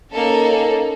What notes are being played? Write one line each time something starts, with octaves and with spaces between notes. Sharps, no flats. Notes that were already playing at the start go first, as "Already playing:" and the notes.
A#3 C#4 D#4 A4